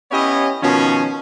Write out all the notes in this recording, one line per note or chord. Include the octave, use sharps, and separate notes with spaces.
B3 C#4 E4 G4 C#5 D#5
B2 D#3 F3 C#4